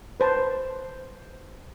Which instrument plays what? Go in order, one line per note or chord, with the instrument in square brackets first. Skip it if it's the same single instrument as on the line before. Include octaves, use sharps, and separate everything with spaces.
[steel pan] B4 C5 A5